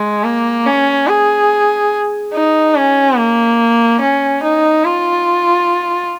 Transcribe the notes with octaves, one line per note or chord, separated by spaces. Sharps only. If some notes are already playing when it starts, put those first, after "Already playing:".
Already playing: G#3
A#3
C#4
G#4
D#4
C#4
A#3
C#4
D#4
F4